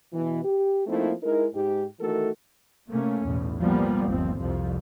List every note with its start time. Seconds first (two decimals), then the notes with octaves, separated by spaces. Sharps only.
0.13 B2 E3
0.44 G4
0.87 F3 A3 A#3 C4 D#4 E4
1.22 G#3 D#4 E4 A#4
1.54 G#2 G4
2.00 D#3 E3 A3 F#4 A4 A#4
2.89 C3 A3 A#3 C#4
3.25 B1 E2 A2
3.60 F3 G3 A#3 B3
4.09 G1 D#2 F3 C4
4.40 C2 F2 C3 F3